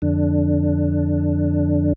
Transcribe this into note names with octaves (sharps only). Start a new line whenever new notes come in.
F2 D3 D4